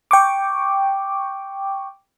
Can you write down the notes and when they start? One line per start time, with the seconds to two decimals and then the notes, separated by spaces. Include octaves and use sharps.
0.11 G5 C#6 D6